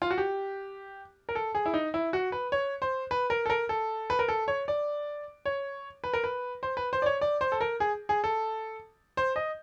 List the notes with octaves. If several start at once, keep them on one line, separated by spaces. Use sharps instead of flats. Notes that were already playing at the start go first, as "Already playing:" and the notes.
F4
F#4
G4
A#4
A4
G#4
E4
D#4
E4
F#4
B4
C#5
C5
B4
A#4
A4
A#4
A4
B4
A#4
A4
C#5
D5
C#5
B4
A#4
B4
C5
B4
C5
D5
C#5
D5
C5
A4
A#4
G#4
G#4
A4
C5
D#5